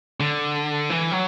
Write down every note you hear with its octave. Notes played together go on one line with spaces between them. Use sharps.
D3
E3
F#3